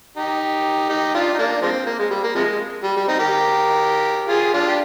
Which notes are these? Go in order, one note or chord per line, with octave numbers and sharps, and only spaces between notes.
D#4 G4
D#4 G4
D4 F4
D#4
A#3 D4
F3 G#3 C4
A#3
G#3
G3
A#3
C3 F3 G#3
G3
G3
C4 D#4
G4 A#4
F4 G#4
D4 F4
G4